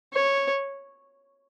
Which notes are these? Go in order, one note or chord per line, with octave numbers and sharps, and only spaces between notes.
C#5